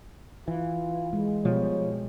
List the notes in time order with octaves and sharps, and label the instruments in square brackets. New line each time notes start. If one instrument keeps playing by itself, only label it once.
[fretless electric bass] E3 [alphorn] F4
[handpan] G#3
[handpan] B2 [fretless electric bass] F3 G3 [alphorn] C#5